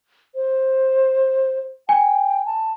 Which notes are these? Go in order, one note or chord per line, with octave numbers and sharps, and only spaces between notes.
C5
G5 G#5
A5